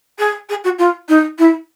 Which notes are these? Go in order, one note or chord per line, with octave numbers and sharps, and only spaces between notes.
G#4
G#4
F#4
F4
D#4
E4